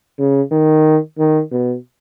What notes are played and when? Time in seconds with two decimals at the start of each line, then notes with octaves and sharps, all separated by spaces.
0.19 C#3
0.51 D#3
1.18 D#3
1.51 B2